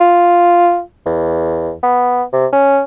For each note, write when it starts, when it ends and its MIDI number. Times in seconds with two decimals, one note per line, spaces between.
0.01 0.81 65
1.06 1.73 40
1.83 2.24 59
2.33 2.47 48
2.53 2.82 61